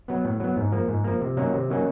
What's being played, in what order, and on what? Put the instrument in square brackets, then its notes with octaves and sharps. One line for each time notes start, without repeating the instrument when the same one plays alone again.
[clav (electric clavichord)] F#3 B3
A2
F#3 B3
G#2
F3 A#3
G#2
F3 A#3
C3
D#3 F#3 A#3 C#4
C3
D#3 F#3 A#3 C#4